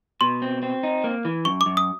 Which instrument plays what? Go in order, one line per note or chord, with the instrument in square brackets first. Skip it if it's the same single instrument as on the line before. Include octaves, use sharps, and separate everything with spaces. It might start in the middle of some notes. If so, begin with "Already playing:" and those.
[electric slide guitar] B2 [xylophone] C6
[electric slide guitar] C4
C4
D#4
A#3
E3
[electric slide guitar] F#2 [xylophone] C#6
[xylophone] D6
[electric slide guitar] F#2
[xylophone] D#6